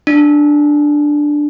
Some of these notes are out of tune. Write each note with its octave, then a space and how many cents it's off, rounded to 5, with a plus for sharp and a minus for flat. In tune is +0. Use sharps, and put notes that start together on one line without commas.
D4 +5